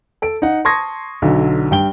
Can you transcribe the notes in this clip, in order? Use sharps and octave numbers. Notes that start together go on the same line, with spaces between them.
A4 D7
D#4 F#5
A5 C6 C#6 D#6 G#6 A#6
B1 D3 F#3
G2 G5 G7